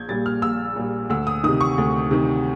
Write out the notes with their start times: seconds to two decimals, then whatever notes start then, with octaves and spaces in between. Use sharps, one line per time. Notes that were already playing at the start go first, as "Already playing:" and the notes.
Already playing: A#1 G6 G#6
0.08 A#2 G3 A6
0.26 F6
0.42 A#1 E6
0.76 A#2 G3
1.10 D2 E6
1.27 D#6
1.44 C3 D#3 D#6
1.61 C#6
1.78 D2
2.11 C3 D#3